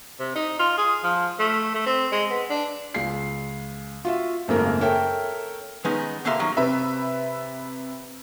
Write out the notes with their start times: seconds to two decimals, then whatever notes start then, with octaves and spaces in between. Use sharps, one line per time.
0.20 C3
0.35 D#4
0.59 F4
0.78 G#4
1.04 F3
1.39 A3
1.74 A3
1.86 C4
2.12 G#3
2.30 B3
2.50 D4
2.94 C#2 C7
4.05 F4 F#4 E5
4.48 G#1 F#2 C#3 A3 A#3 A#4
4.81 A4 A#4 C#5 E5 G5
5.85 D#3 G#3 B3 C#4 D#4
6.25 B2 D3 A#3 E5 F5 C6
6.39 D#3 F#3 C#4
6.57 C3 B4 E5